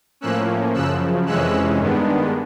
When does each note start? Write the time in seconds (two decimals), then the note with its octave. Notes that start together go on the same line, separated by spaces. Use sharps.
0.21 A2 F3 A#3 C#4 E6 F#6
0.74 F#2 C#3 F3 E6 F#6
1.26 F2 C3 E3 G#3 C#4 E6 F#6
1.79 G2 D#3 G#3 B3 D4